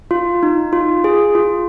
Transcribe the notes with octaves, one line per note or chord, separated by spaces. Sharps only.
F4
D#4
F4
G#4
F4